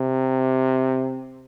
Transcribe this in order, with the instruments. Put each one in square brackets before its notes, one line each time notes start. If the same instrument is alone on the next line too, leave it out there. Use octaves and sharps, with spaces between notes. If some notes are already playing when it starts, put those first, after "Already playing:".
Already playing: [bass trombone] C3